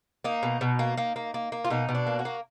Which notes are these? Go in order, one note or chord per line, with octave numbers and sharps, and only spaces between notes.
A#3 D#4
B2
B2
A#3
A#3
A#3
A#3
A#3
F4
B2 D#4
B2
D4
A#3
F#4
A#3